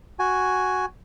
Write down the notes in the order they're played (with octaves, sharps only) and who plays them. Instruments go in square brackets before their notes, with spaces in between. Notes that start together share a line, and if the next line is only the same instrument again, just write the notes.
[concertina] F#4 G#5